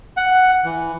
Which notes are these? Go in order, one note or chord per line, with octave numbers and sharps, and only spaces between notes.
F#5
E3